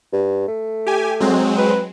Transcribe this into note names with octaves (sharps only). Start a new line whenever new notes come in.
G2
A3
G4 G#5
F#3 G#3 C4
B4